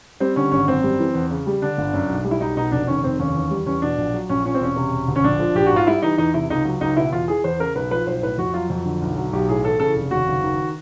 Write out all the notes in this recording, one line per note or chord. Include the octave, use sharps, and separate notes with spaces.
G3 C4
D3 C#4
G#1 C#4
F#2 C4
G3
E3
E2
C#3
G3
D3 D4
G1
F#2
B1
G3
E4
B1 D#4
B2 D#4
F1 D4
D#3 C#4
F1 C4
D#2 C#4
E2
G3
E2 C#4
B2 D4
A#1
F#3
A#1 C#4
A#2 C#4
C4
E1 C#4
C3
E1
D2
C#4
A#1 D4
F3
A#1 G4
F#4
G#2
F4
G3 E4
E3 D#4
E2 D#4
C3 E4
C#2 D#4
F#3
C#2 D#4
B2 E4
E2 F4
E3 G#4
E2 C5
C#3 A#4
B1 B4
F3 B4
B1 C5
A2 B4
F2 F#4
F#3 F4
F2
D3
B1
F#3
B1 G4
A2 G#4
E3 A4
C#3 A4
F1
D#2 F#4
F#1
D#3